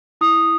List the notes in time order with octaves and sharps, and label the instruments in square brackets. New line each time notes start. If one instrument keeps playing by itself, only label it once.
[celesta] E4 D#6